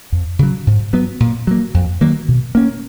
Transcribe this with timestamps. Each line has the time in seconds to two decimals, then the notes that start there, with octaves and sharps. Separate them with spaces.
0.12 F2
0.39 C#3 F#3
0.67 G#2
0.93 F#3 B3
1.20 A#2
1.47 F#3 A#3
1.74 F2
2.01 D#3 F#3 A#3
2.28 B2
2.55 A#3 C#4